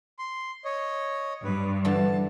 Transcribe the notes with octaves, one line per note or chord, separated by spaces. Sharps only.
C6
C#5 D#5
G2 B4
D3 E3 A5